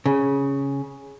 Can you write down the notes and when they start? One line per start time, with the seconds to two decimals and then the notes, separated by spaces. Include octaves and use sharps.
0.06 C#3